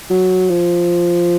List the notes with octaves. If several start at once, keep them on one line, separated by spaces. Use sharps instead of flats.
F#3
F3